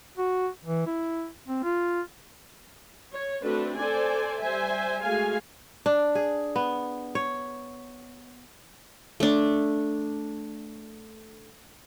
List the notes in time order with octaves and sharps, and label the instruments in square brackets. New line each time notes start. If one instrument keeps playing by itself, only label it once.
[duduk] F#4
E3
E4
C4
F4
[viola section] C#5
A3 C4 D4 F#4 A4 B4
A4 C5 D5 G#5
G3 C5 E5 G#5
G#3 A3 F#4 F5 G#5
[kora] D4
G#4
B3
C#5
[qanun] A3 D4